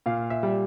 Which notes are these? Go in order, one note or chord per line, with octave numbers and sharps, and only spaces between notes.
A#2 F5
E5
G3